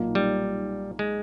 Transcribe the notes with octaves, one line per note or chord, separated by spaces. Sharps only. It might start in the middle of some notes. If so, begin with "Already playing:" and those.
Already playing: B1 A#2 A#3 D#4
G3
G#3